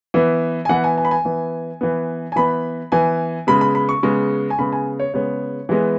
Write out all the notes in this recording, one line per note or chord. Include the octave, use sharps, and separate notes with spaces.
E3 B3
G#5
E3 B3 F#5
G#5
G#5
B5
G#5
E3 B3
E3 B3
G#5
E3 B3 B5
E3 B3 G#5
C#3 G#3 B3 B5
B5
B5
C#6
C#3 G#3 B3
G#5
C#3 G#3 B3 B5
G#5
C#5
C#3 G#3 B3 C#5
E3 G#3 B3